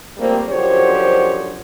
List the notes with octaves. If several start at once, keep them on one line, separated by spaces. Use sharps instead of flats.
F3 G3 A3 A#3 C4
F#2 D3 F3 G4 C5 C#5